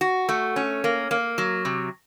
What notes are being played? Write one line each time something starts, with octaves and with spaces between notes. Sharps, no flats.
F#4
A3
C#4
A#3
A#3
F#3
C3